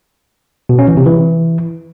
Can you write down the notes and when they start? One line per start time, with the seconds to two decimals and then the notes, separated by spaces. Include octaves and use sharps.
0.69 B2
0.79 C#4
0.88 E3
0.97 C3
1.06 E3